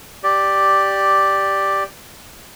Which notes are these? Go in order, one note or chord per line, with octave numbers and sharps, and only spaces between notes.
G4 D5